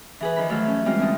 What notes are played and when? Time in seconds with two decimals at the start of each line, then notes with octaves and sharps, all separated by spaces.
0.20 E3 G#4 B4
0.36 D#3 F3 A#4 B5
0.49 E3 F#3 A3 F#4 A4 F5
0.67 C#4
0.85 E3 G3 G#3 C4 F4 F#4
0.99 D2 C4 D#5